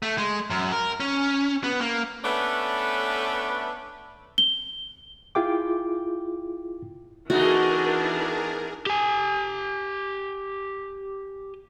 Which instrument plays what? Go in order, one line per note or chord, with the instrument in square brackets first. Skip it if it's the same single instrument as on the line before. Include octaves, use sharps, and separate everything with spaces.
[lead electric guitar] A3
G#3
F#2
A#4
C#4
B3
A#3
[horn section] A3 B3 C#4 D4 A4 B4
[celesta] G7
[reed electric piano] E4 F4 G#4 G5 D6
[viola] E3 D4 [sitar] A3 B3 D#4 [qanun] F#4 [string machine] G#4 A#4
[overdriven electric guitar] G4 G#5